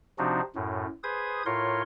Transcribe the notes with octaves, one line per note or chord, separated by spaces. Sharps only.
C3 F3 C4 D4 D#4 F#4
F#2 A2
G#4 B4 C5 D#6 G#6
A2 F4 A#4 C#5 C6